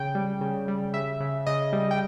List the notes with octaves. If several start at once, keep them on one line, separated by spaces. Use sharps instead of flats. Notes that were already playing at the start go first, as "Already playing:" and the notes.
Already playing: C#3 G5
G3
C#3
G3
C#3 E5
C#3
C#3 D#5
G3
G5